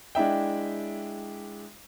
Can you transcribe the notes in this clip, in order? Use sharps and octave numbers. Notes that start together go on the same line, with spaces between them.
G#3 D4 E4 E5 G5